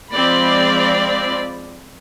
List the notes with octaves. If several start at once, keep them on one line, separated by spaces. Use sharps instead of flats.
F3 G#3 C4 D5 B5